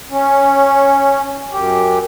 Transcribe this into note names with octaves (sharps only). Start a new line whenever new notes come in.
C#4
F#2 G4